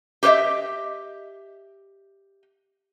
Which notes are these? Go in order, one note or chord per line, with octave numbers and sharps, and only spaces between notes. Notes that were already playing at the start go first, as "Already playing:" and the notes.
G4 B4 C5 D#5 E5